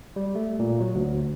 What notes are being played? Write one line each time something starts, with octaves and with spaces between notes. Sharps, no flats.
G3
A3
A#2
F#3
D2